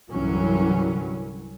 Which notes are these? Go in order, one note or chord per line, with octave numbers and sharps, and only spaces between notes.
C2 G2 D3 E3 F#3 C#4